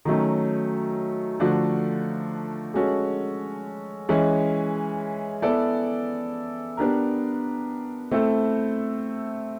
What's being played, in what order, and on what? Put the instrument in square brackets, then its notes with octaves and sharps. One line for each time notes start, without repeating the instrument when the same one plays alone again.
[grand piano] D#3 F#3 A3 C#4
D3 F3 A3 D4 F#4
G#3 C#4 F#4 A4
E3 G#3 C#4
B3 E4 A4 D5
B3 D4 G4 A#4
A3 C4 E4 A4